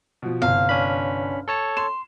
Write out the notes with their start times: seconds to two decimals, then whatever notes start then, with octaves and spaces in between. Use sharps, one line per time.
0.22 B2 F3
0.42 G1 C2 F5
0.69 C#4 D4 B5
1.48 A4 C#5 A5
1.77 C6 E7